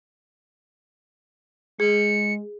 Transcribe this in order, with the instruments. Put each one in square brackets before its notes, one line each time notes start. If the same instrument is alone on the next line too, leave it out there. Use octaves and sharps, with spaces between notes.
[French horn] G#3 [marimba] G#4 [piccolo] C#7